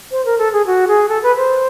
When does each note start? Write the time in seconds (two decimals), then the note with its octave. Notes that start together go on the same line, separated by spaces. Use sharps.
0.12 C5
0.26 A#4
0.39 A4
0.53 G#4
0.67 F#4
0.88 G#4
1.09 A4
1.23 B4
1.37 C5